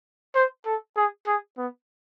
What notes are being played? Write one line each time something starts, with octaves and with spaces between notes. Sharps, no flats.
C5
A4
G#4
G#4
B3